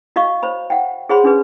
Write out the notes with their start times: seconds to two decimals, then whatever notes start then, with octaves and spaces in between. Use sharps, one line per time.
0.16 F#4 D#5 F5 C#6
0.43 C5 C#5 B5
0.70 F#5 G5
1.09 G#4 C5 C#5 F#5 B5 C6
1.24 C#4 D4 G#4 B4